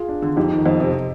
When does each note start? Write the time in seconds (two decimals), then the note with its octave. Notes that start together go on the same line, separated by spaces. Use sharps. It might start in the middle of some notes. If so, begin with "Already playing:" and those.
Already playing: F4 G#4
0.09 D4
0.22 D3
0.36 F2 D#4 G4
0.52 D#3
0.66 F2 C5 D#5
0.80 C3 C5 D#5